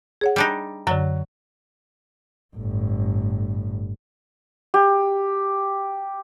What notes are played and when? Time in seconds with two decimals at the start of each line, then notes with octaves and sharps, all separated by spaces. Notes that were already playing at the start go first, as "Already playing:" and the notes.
0.21 G#4 C#5 F#5
0.36 G3 D4 D#4
0.87 F#2 D3 F#3
2.56 G1 A2
4.74 G4